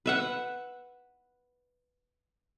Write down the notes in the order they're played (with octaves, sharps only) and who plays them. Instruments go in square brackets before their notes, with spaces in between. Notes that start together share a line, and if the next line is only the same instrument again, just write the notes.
[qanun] B4 E5 F#5